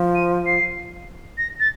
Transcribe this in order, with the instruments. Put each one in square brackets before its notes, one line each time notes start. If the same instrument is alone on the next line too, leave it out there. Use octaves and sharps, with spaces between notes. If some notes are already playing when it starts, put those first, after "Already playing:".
Already playing: [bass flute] F3
[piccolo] D#7
C7
A#6
A6